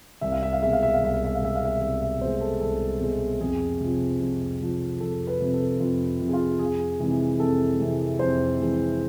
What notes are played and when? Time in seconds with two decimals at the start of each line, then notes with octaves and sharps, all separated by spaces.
0.21 C2 E5
0.32 F5
0.43 E5
0.53 F5
0.62 B2 G#3 E5
0.73 F5
0.83 E5
0.94 F5
1.02 C2 E5
1.14 F5
1.24 E5
1.35 F5
1.42 B2 G#3 E5
1.56 F5
1.65 E5
1.81 C2 E5
2.01 E5
2.21 B2 G#3 C5
2.41 A4
2.61 C2 A4
3.01 B2 G#3
3.41 F2 G#4
3.81 C3 F3
4.20 F2
4.61 C3 F3
5.00 F2 A4
5.27 B4
5.40 C3 F3
5.54 A4
5.80 F2 F4
6.20 C3 F3
6.28 G#4
6.33 F4
6.59 F2 G#4
7.00 C3 E3 G#3
7.40 F2 A4
7.79 C3 E3 G#3
8.19 F2 C5
8.59 C3 E3 G#3